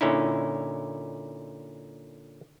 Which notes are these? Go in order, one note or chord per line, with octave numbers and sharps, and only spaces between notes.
A#2 D3 C#4 D#4 E4